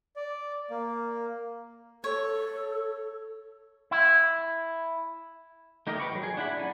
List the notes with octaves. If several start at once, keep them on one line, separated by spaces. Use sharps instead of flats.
D5
A#3
A4 C#5
E4
A3 D#4 G4 A#4 D#5
B4 G5 B5 C#6
F3 F#3
G#4
D4 E4 F#5 G5 B5
C#4 D#4 D5